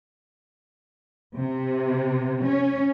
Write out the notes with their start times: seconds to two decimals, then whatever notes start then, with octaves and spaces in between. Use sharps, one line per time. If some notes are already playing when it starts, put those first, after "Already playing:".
1.38 C3
2.44 C#4